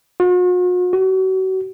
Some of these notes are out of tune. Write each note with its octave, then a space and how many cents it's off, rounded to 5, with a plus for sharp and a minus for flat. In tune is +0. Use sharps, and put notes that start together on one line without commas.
F#4 -45
F#4 +35